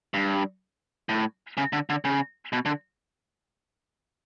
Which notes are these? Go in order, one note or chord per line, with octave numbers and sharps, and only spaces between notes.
G2
A2
C#3
D3
D3
C#3
B2
D3